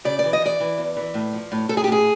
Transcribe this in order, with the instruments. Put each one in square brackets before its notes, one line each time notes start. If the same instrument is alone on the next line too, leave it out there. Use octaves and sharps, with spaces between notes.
[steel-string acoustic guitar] C#3 D5
D5
E3
D#5
E3 D5
E3
E2
E3
A2
F3
A2
A2 A4
G#4
G4
A2
G#4